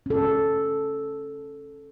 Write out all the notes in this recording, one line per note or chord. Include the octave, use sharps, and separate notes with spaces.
C#4 A4